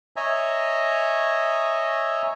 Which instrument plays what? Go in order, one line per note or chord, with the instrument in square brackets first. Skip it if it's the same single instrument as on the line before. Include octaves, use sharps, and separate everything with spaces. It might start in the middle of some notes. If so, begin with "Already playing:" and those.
[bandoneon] C#5 D#5 E5 G#5 A#5